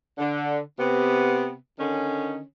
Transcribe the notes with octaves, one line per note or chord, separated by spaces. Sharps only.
D3
C3 B3
D3 D#3 C#4